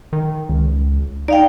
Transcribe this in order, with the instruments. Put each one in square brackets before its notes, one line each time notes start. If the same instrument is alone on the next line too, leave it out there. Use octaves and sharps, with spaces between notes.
[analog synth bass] D#3
C#2
[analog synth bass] D#4 [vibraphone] D5 F5 G5